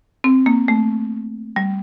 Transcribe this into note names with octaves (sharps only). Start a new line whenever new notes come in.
C4
A#3
A3
G3